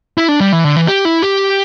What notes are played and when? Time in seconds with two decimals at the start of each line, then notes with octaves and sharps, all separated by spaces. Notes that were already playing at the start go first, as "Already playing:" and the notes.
0.18 E4
0.29 D4
0.40 G3
0.53 E3
0.64 D3
0.76 E3
0.88 G4
1.05 E4
1.22 G4